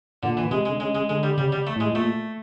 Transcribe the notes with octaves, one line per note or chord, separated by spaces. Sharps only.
A#2 D3
E3
C3 G#3
G#3
D3
C#3 G#3
G#3
D3 G#3
G3
C#3 G3
G3
A3
A2 G#3
A2
A#2 A3